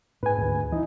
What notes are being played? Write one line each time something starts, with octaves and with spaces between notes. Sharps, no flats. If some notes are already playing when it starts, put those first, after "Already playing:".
G#2 B4 G#5
D2 G#2
E3 D#4 E4 D#5